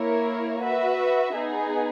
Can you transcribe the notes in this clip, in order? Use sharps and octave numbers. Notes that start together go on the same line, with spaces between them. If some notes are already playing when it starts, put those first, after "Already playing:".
Already playing: A#3 E4 A#4 C#5
F#4 B4 E5
B3 D#4 G#4